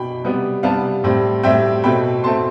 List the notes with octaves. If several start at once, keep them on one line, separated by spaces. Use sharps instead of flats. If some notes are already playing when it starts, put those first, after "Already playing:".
Already playing: B2 G5 B5
C3 G3 B3
C3 G3 B3 F5 A5
A2 G3 C4
A2 G3 C4 E5 G5
B2 A3 C4 G5 B5
B2 A3 C4 A5 C6